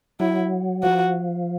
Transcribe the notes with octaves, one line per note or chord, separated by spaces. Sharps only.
F#3 E4
F3 F#4